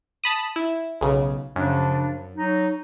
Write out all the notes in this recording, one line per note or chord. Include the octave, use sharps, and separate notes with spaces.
A5 B5 D#6
E4
B1 C#3
F#2 C#3 F3 D4
F#3 D#4